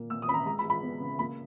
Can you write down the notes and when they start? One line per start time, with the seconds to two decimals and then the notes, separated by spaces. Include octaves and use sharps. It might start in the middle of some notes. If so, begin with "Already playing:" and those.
Already playing: A#2 A#3
0.10 A#2 E6
0.22 D#6
0.28 C#4 B5
0.34 A#5
0.46 G#3 A#5
0.59 B5
0.64 G#3
0.70 B5
0.83 B3
1.00 C#3
1.19 A#3 B5